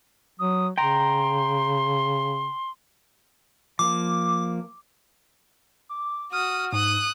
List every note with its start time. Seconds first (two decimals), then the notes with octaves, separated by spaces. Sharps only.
0.39 F#3 D#6
0.78 C#3 G5 A#5 C6
3.79 F3 A#3 D6
5.89 D6
6.33 F#4 D#6 F6
6.72 G#2 D#6 F#6